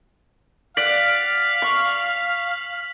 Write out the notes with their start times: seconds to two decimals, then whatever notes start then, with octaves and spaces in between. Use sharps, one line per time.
0.77 D5 F5 F#5 B6 F#7
1.62 C#6